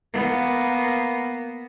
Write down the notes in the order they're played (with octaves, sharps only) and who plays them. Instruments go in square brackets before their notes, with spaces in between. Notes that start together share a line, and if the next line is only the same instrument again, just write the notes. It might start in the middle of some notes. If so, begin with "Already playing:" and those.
[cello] A#3 B3